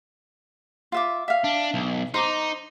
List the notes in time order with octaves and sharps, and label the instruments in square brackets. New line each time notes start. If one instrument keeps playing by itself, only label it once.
[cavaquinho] F4 E5 D6
E5 F5
[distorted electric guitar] D4
B1
[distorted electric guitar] D#4 [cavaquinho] C5 A#5 D6